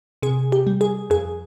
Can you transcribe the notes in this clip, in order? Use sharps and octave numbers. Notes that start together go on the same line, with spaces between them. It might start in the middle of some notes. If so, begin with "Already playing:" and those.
C3 G#4
G4
G3
G#4
F2 G#4